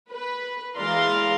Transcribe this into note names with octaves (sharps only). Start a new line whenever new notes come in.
B4
E3 G#3 D5 F5 A#5 C6